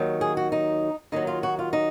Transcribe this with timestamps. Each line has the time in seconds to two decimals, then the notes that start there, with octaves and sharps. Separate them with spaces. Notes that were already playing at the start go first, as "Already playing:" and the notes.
Already playing: D#2 D#3 F#3
0.21 G#4
0.37 F#4
0.52 D#4
1.12 D#2 D#3 F#3 D#4
1.27 F4
1.43 F#4
1.59 F4
1.73 D#4